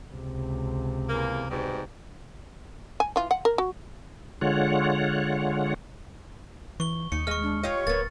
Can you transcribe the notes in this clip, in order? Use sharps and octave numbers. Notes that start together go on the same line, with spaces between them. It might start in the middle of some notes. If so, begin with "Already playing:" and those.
C#2 C3
E2 A#3
G#2 B2 G3
G#5
E3 F4
F#5
A#4
F#4
D3 G#3 F4 C#5 F#5
E3 C#6 G7
D#2 D#4 C#7
G#3 D#5 C#6 F6
D4
F4 G4 C#5 D#5
D1 A#3 B3 A6